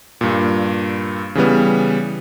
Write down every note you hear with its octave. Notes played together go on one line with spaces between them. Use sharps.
G2 A#2
C#3 E3 G3 B3